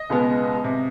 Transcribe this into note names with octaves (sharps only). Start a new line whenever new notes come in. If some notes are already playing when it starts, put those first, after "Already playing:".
Already playing: D#5
C#2 B2 G#3 B3
C3